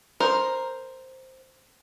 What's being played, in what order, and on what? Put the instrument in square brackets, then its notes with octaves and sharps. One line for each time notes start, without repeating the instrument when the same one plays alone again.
[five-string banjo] A#4 C5